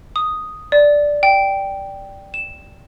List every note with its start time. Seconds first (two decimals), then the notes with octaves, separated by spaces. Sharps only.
0.16 D#6
0.72 D5
1.23 G5
2.34 E7